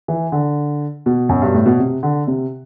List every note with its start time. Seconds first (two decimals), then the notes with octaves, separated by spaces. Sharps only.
0.08 E3
0.32 D3
1.06 B2
1.29 F#2
1.42 G2
1.54 A2
1.66 B2
1.79 C3
2.03 D3
2.27 C3